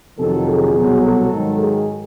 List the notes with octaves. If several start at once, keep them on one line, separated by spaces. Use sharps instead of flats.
F2 C3 D#3 F#3 A4
G#4
C2 B2 F#3
A4
G#2 D#3 F#3
G#4